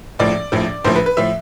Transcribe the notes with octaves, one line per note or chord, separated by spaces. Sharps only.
A#1 A2 F3 D5
A#1 A2 F3
A#1 A2 F3 C5
B4
B4
A2 F3 E5